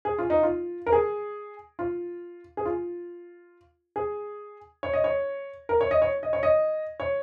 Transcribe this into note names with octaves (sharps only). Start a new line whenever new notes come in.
G#4
F4
D#4
F4
A#4
G#4
F4
G#4
F4
G#4
C#5
D#5
C#5
A#4
C#5
D#5
C#5
D#5
C#5
D#5
C#5